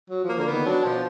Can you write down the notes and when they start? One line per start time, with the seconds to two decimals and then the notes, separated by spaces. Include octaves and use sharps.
0.10 F#3
0.24 F3 A#3
0.38 D3 A#3
0.48 D#3 B3
0.66 F#3 D4
0.85 B2 F3